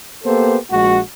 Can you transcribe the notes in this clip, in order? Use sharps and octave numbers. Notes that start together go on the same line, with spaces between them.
A#3 B3 G4 A4 C5
A#1 G#3 F#4